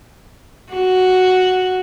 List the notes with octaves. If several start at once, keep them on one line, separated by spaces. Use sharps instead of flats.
F#4